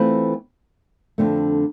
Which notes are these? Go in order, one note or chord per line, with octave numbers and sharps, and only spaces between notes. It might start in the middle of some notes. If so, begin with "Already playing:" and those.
Already playing: E3 A3 C4 F4 B4
F2 D3 A3